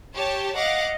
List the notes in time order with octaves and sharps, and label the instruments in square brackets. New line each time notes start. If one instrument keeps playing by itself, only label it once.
[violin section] G4 C#5 A5
[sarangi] D#5 [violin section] F5 F#5 D6